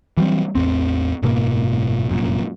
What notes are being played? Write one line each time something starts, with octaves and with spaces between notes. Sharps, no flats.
E3 F#3 G3 C4
A1 E2 C4
F#1 G#2 B2 A#3
F1 F#2 A#2